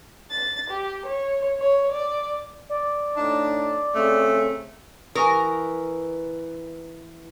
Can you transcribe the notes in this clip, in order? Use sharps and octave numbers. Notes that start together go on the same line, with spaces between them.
A6
G4
C#5
C#5
D5
D5
A2 D4 D#4
C#3 A3 C4
E3 A#4 G#5 C#6 D#6